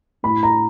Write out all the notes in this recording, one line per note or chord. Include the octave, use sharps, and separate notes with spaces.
A2 B5
A#5